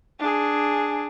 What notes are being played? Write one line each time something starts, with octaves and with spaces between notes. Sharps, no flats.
D4 G#4